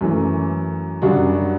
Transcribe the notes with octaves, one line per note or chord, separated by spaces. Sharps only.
F#2 E3 A3
F#2 C#3 G3 D4 F#4